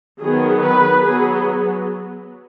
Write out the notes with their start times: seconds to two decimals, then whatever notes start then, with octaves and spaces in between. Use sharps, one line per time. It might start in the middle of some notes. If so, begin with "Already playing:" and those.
0.20 D#3 F#3 B3 G#4
0.62 B4
1.04 F#3 B3 G#4